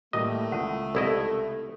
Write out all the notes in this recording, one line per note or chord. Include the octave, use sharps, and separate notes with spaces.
A2 G3 A3 A#3 D#5 D#6
C#2 F#5 A5 D#6
C2 E4 A4 D#5